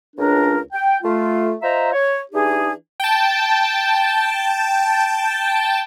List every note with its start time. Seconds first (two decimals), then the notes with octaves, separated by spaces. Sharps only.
0.16 C#2 D4 A#4
0.73 G5
1.03 A3 F4
1.62 F4 C5 D#5 E5 A#5
1.93 C#5
2.32 E3 D4 D#4 G4 G#4
3.00 G5 A5